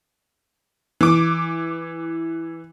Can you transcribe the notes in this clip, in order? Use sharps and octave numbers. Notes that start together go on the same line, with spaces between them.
E3 D6